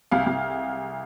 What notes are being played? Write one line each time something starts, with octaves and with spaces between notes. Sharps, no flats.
C2 F5
C2